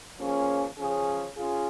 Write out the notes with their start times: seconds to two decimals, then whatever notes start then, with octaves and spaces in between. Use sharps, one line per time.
0.19 F3 A#3 C#4 G#4
0.78 C#3 F3 C#4 G#4
1.37 C#4 F4 G#4